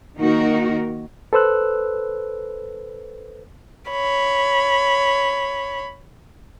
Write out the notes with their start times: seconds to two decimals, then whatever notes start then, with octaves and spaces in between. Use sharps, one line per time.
0.18 D#3 A#3 D#4 F#4 A#4
1.33 A4 B4 C5 E6 F#6
3.91 C#5 B5